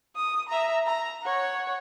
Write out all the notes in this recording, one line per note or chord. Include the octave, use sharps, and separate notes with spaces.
D#6
E5 A#5
A#5
C#5 F#5